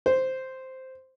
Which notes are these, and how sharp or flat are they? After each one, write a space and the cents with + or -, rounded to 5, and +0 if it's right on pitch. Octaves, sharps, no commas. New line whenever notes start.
C5 -5